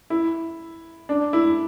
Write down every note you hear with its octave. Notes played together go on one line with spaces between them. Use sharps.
E4
D4
E4